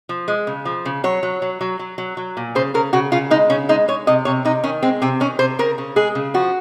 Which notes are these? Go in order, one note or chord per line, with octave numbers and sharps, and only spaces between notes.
F3
G#3
C#3
F3
C#3
F#3 C#5
F#3
F#3
F#3
F#3
F#3
F#3
A#2
C#3 C5
C#3 A#4
C#3 F#4
C#3 F4
G#3 D#4
C#3 C#4
G#3 D#4
G#3 C#5
C3 D#5
C3 C#5
C3 D#4
D#3 C#4
G#3 C4
C3 C4
D#3 C#4
C3 C5
C#3 A#4
C#3
G#3 G#4
C#3
F3 F#4